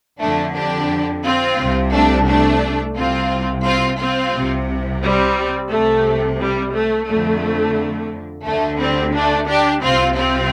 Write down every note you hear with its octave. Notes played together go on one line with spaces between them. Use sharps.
F2 D3 A3 D4
D4 G4
C4 F4
C2 C3
A3 D4
A3 D4
C2 C3 C4 F4
C4 F4
C4 F4
C2 C3
G3 C4
C2 C3 A3
G3
A3
F2 D3 A3
D2 D3 A3
G3 C4
A3 D4
D4 G4
C2 C3 C4 F4
C4 F4